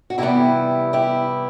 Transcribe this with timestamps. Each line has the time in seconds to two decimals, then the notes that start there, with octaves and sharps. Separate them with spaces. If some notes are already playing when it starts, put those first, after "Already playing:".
0.10 F#4
0.18 C3 E3 G3 B3 E4 G4
0.93 E4 G4